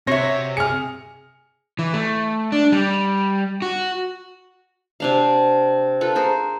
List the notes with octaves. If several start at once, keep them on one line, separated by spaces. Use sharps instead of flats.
C3 C4 F#4 C#5 E5 A#6
G#4 F6 C#7
E3
A3
D4
G3
F#4
C3 D4 F5
F4 A4 B4
G#4 A#4 C5